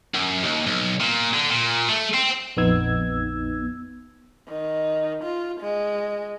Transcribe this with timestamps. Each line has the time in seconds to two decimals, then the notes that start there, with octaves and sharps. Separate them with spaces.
0.15 F#2
0.44 D#2
0.67 B1
1.00 A#2
1.34 D3
1.50 A#2
1.89 A3
2.14 C4
2.57 A#1 F2 B3 D#4 E6 G#6
4.48 D#3
5.23 F4
5.60 G#3